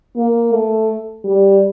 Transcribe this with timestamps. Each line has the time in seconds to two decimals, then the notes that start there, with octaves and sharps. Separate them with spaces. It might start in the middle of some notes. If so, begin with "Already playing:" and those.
0.17 A#3
0.53 A3
1.25 G3